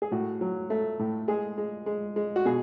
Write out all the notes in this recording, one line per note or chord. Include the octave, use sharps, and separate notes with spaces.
G#4
A2 F#4
F#3
A3
A2
G#3 G#4
G#3
G#3
G#3
F#4
B2 G#4